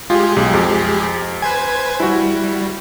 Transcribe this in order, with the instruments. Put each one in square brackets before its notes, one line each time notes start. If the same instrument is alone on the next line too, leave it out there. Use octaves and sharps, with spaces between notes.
[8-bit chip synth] G#3 G4 G#4 [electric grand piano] F4
[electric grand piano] B1
F2
[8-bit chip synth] B4 C5 G#6 [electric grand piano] G#5
[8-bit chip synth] G3 [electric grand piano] E4 F#4